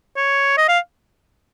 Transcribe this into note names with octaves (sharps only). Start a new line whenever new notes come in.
C#5
D#5
F5